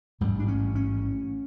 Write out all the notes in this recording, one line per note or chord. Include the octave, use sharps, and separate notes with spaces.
A1 G#2 G3
D4
C#4
C#4